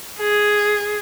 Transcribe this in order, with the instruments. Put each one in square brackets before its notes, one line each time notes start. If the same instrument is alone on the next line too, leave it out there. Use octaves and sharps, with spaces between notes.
[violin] G#4